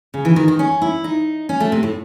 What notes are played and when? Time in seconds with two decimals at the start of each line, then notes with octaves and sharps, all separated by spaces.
0.14 C#3
0.25 E3
0.36 D#3
0.48 D#3
0.59 C#4
0.82 E4
1.04 D#4
1.49 C#4
1.60 A3
1.72 C3
1.83 A2